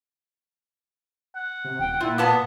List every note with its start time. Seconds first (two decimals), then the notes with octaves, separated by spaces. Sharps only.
1.35 F#5
1.64 C3
1.79 D#1 G5
2.00 A#2 E4 F4
2.18 A#3 B3 A5 D#6